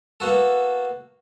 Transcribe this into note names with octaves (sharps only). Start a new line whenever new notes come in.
A#3 B3 F#4 A4